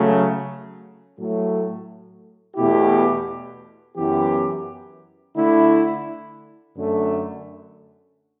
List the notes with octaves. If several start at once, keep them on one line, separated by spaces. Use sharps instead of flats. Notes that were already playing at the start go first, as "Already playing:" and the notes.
Already playing: C#3 F#3 A3
A2 F#3 A3
E2 B2 A3 E4 G4
F#2 E3 B3 E4 G4
D3 A3 E4
F#2 D3 A3